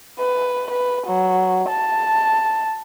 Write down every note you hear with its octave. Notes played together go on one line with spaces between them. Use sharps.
B4
B4
F#3
A5